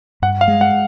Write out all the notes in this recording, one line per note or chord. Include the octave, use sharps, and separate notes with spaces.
G2 F#5
F5
G#3
F#5